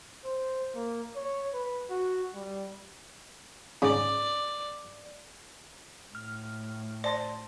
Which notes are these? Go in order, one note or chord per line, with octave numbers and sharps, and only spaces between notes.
C5
A#3
C#5
B4
F#4
G3
G#2 C#3 D5
A2 F6
C5 D5 A5 C6